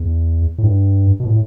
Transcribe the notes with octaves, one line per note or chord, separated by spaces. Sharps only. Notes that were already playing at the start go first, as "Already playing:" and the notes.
Already playing: E2
A2
G2
B2
A2